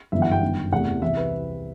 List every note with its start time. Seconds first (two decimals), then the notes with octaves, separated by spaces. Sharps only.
0.12 G1 F#2 E3 E5
0.22 F#5
0.32 G5
0.42 G1 F#2 D#3
0.72 E2 C3 E3 A3 F#5
1.02 C2 C3 E3 G3 E5
1.17 B4